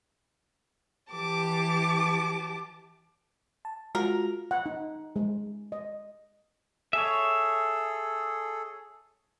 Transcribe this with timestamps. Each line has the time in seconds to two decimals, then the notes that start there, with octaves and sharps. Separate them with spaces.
1.10 E3 G4 A5 D6
3.65 A5
3.95 G#3 F4 F#4 A#4
4.51 F#5
4.66 D#4
5.16 G#3
5.72 D#5
6.93 G#4 A4 C#5 E5